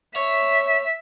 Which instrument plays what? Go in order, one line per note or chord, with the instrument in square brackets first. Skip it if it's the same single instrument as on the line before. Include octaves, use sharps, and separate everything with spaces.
[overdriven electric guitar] C#5 [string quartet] E5